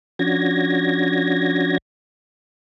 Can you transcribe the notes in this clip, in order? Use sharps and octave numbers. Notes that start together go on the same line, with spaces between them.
F3 C#4 D4 F#4 G#6 A#6